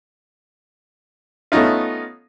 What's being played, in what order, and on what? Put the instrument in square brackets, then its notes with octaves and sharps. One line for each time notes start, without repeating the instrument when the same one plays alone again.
[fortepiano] A3 B3 C#4 D#4 F4